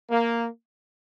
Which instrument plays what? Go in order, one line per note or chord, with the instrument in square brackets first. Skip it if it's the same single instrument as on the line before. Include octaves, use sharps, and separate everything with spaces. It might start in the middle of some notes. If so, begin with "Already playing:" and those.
[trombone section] A#3